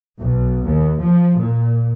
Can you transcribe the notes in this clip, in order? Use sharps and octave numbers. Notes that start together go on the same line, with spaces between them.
B1
D#2
F3
A#2